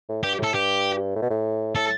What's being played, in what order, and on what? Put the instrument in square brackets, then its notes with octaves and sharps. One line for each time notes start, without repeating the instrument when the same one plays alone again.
[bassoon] A2
[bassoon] G2 [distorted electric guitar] G4
[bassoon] A2 [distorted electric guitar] A4
[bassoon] G2 [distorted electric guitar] G4
[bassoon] A2
B2
A2
[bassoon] A2 [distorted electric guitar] A4